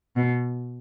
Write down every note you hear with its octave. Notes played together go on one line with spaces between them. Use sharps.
B2